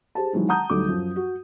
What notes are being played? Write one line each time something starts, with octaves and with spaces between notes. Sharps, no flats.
G4 G#4 C5 A5
D#3 E3 F#3 G#3 B3
F#5 A5 A#5 D#6 G6
D2 F#3 G3 D#4 A4 D6
F#2 F3 F#3
F#4